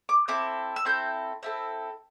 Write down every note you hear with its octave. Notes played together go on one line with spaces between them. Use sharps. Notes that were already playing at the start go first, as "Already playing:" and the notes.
D6
C4 E4 A4 D6
E6
C4 E4 A4 G6
C4 E4 A4